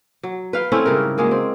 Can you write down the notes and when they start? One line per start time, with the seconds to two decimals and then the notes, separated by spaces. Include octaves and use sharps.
0.23 F#3
0.53 B4 F5 G5
0.72 A3 C4 C#4 E4
0.86 G#2 C#3 G3 A#4
1.18 F#3 G#3 A#3 G#4
1.31 C4